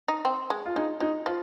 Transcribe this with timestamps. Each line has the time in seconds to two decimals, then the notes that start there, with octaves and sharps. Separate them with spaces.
0.08 D#4
0.25 C4
0.50 G#3
0.65 F4
0.76 G#3 D#4
1.00 G#3 D#4
1.26 F3 F4